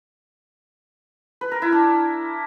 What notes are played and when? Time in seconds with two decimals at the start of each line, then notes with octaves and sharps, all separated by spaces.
1.41 B4
1.51 A#4
1.62 E4
1.72 D4